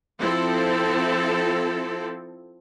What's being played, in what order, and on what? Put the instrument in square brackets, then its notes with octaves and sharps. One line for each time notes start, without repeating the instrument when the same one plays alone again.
[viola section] F3 C4 E4 A4